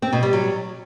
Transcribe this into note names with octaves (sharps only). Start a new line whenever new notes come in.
C4
B2
G3
F#3